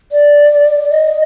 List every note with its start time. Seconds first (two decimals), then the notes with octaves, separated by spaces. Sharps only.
0.11 D5
0.90 D#5